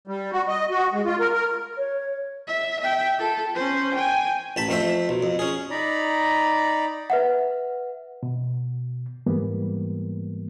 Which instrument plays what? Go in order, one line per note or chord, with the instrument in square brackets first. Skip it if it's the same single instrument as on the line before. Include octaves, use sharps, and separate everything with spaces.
[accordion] G3
F#4
D#5
F#4
G#3
F4
A#4
A#4
[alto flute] C#5
[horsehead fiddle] E5
E5 G5
F4 A4
C#4 C5
G5 G#5
[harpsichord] A1 A5 B5
F2 A3 C5 E5
B1
F2
C#4 G#4
[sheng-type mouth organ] D#4 D5 A#5 B5
[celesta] B4 E5 F#5
[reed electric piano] B2
G#2 E3 G3 A#3 B3